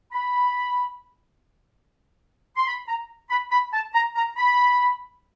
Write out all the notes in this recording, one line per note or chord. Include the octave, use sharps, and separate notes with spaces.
B5
C6
B5
A#5
B5
B5
A5
A#5
A#5
B5